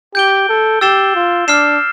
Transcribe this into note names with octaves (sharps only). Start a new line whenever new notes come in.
G4 G6 D7 G7
A4
G4 E6 A6 C7 E7 G7
F4
D4 D6 F6 C7 E7